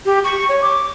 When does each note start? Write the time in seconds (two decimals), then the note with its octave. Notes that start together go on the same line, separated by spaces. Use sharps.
0.05 G4
0.24 C#6
0.49 C#5
0.61 D6